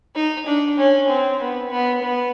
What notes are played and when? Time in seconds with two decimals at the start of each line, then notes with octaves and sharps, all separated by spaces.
0.16 D#4
0.46 D4
0.78 C#4
1.08 C4
1.40 B3
1.71 B3
2.02 B3